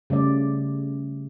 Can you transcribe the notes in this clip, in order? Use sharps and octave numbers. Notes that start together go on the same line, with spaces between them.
C#3 G3 A3 D5